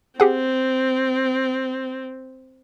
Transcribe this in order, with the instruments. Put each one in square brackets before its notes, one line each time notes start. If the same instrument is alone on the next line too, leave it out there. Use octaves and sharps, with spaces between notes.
[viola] C4 [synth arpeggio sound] G4 G#4 F#5